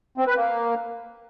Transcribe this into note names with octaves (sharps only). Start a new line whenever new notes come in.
C4
B4
A#3